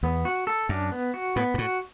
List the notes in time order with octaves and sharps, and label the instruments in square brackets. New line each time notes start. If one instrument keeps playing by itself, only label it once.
[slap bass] E2 [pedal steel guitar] B3
[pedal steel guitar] F#4
A4
[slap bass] F#2 [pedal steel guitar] D4
[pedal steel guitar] B3
F#4
[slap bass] A2 [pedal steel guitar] B3
[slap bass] G2
[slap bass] A2 [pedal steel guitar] F#4